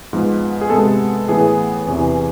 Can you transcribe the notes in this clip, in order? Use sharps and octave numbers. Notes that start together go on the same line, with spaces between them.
G#2 F3 B3
G#4
C3 G#3 B3 A4
A2 E3 B3 G#4
E2 C3 E3